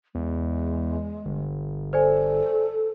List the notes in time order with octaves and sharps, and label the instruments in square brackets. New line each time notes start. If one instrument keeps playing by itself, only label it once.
[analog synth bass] E2 [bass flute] G#3
[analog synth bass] G1
[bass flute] A4 [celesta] C5 D5 G#5